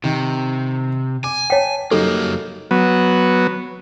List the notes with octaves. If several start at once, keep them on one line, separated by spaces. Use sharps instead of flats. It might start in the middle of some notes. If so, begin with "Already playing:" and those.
C3 D#3
G#5 D6
C#5 G5 A5 B6
F#2 F#3 G3 A#3 D#4 A4
F#3 B3